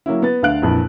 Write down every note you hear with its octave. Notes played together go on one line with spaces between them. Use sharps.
F#3 A#3 C#4 E4
B3 B4 A6
D2 D3 F5 F#6 D7
A#1 F2 A#2 E3